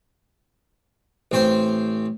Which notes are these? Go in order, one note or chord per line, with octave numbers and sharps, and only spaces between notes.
A1 C4 C5